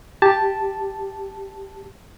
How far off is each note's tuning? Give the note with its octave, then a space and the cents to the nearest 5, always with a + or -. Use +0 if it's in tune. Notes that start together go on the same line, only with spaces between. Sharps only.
G4 +0 A5 -5